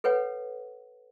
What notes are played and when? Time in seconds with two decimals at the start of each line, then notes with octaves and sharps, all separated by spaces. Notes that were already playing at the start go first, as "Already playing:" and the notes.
0.04 A4 B4 C#5 F#5